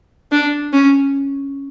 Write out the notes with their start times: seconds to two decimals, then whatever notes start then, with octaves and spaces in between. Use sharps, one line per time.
0.32 D4
0.73 C#4